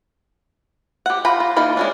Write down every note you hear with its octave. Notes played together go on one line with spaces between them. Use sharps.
G4 F#5
F4 A#5 B5
F4
E3 A#3 D#4 F4 B5
G#3 C#4 D4